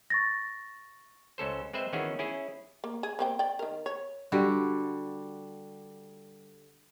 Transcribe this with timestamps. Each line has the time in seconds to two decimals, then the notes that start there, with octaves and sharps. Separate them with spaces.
0.10 C#6 A6 A#6
1.38 C#2 C#4 A4 C5
1.73 G#3 C4 B4 C5 E5
1.93 D#3 E3 B3 C#4 F#4 G#4
2.19 C#4 E4 G#4
2.84 A#3
3.03 G#4
3.19 A#3 C4 G5
3.39 D5 G5
3.59 D#3 A#4
3.86 C#5
4.32 D3 G3 F#4